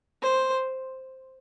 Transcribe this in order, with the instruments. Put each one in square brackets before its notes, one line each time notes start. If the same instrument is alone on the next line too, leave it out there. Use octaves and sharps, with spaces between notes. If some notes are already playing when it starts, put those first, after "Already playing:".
[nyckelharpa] C5